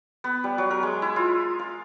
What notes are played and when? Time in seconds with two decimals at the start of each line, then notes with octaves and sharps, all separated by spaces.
0.24 B3
0.44 G3
0.58 F#3
0.71 A#4
0.83 G#3
1.02 E4
1.16 F4
1.59 F5